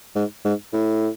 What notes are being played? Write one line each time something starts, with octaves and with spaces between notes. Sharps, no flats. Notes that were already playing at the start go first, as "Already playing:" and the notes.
G#2
G#2
A2